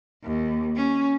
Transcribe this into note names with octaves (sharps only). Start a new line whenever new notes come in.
D#2
C#4